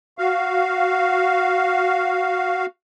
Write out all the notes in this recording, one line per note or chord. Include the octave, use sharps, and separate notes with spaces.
F#4 F5